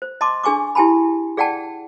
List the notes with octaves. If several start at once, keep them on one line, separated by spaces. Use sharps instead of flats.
C5
D#5 A5 C6 D6
D4 G#4 G#5 C#6 D6
E4 G4 G#5 A5 B5
G#4 D5 F#5 G5 A5